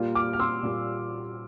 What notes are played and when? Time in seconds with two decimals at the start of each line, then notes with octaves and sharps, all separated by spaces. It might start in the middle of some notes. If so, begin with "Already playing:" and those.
Already playing: A#2 G3 A#3 F4
0.15 D6 F6
0.33 F6
0.39 C6 E6
0.63 A#2 G3 A#3 F4